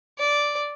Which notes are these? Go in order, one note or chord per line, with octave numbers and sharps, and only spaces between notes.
D5